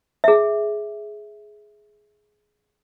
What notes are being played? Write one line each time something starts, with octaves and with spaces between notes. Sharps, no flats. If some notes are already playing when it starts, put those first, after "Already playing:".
G#4 E5